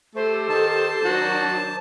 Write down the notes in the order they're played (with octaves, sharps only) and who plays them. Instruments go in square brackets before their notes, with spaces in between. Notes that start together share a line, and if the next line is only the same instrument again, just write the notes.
[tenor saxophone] A3 [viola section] G4 A4 [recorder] C5
[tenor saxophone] D#3 [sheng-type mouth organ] A5
[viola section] D#3 F#3 D4 [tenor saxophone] F#4